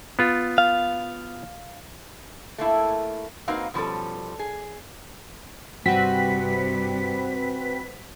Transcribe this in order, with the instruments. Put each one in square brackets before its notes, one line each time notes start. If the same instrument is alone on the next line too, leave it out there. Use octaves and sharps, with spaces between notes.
[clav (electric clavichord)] B3 F4
[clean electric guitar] F5
[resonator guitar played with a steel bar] A3 A#3 E4
A#3 C4 D#4 F#4 B4 F5
B2 F3 G3 C#4 A4
G#4
[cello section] G2 C3 G3 [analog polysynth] C4 B4 [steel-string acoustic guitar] F#4 [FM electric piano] B6